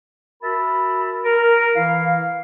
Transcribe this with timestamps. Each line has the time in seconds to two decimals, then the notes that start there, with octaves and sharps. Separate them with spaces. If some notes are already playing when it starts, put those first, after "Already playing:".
0.42 F#4 A#4 E5 A5 B5
1.24 A#4
1.75 E3 E4 F5